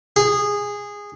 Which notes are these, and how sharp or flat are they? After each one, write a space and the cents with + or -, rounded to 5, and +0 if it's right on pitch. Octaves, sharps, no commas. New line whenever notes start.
G#4 -15